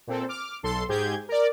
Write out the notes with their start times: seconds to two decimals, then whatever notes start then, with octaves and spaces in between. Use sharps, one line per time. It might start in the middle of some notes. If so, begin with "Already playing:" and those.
0.07 A#2 C4 A4
0.29 D6 F6
0.63 B1 A4 C6
0.89 G#2 G4 G#4 G6 G#6
1.29 A#4 D5